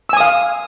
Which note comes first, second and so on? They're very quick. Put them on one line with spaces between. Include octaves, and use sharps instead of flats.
E6 G#5 D#6 F5